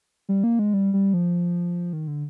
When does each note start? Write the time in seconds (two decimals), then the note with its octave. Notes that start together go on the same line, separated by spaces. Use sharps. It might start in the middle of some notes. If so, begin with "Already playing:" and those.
0.29 G3
0.44 A#3
0.59 G#3
0.74 G3
0.94 G3
1.14 F3
1.93 D#3
2.07 D3